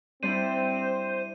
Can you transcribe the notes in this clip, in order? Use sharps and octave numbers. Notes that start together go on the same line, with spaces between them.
G3 C4 D4 E4 C5 D#7